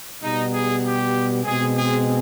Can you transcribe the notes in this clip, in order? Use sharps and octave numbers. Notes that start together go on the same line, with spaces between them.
B2 G3 B3 D#4
G#4
G4
B2 G#3 C4 G#4
G#4